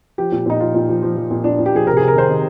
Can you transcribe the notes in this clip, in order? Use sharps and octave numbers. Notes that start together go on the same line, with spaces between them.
F3 G4
A#2
A#2 D#4
F3 F4
A#2
F3
F3
F3
A#2
A#2 D4
A#2
G4
F3 G#4
C3 A#4
G#4
C3
A#4
D#3 C5
D#3